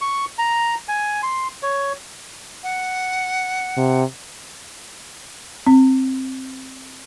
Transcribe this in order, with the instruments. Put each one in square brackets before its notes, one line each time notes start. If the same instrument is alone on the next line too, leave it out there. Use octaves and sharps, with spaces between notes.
[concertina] C#6
A#5
G#5
C6
C#5
[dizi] F#5
[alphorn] C3
[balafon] C4